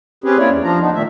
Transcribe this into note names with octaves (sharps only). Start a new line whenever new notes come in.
C4 C#4 G4 G#4 B4
A#3 C#4 E4 C#5 D5
E2
F3 D4 F4 A#5
B3 D4 D#4
A#2 D#3 A3 E5